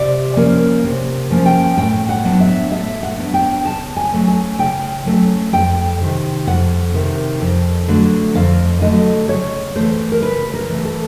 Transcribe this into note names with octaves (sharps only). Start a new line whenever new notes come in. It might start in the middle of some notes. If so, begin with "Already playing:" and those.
Already playing: C3 D5
F3 A#3 C#4
C3
F3 A#3 C#4
G5
A2 G5
F#5
F#3 B3 D4
E5
A2 E5
F#5
F#3 B3 D4
G5
C#3 A5
G#5
F#3 A3 C#4
G#5
C#3 G5
F#3 A3 C#4
F2 G5
C3 D#3
F2 F#5
C3 D#3
F2
D3 F#3 A3
F2 F5
D3 F#3 A3 D#5
C#3 C#5
E3 A3 C5
A#4
C#3 B4
A#4
E3 A3
A4